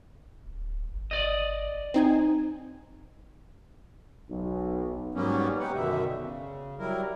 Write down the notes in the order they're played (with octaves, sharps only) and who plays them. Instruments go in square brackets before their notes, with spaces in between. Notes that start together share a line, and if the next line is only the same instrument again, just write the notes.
[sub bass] D1
G1
[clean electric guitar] D5 D#5
[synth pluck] C4 D#4 G#5
[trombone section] B1
[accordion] G#2 F#3 G3 A#3 B3 C#4
D#4 G4 B4 F#5
F#2 B2 D3 D#3 E5
C#3
F#3 G3 E4 A#4